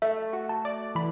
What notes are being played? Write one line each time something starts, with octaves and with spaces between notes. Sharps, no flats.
A3 E5
F#4
A5
D5
E3 B5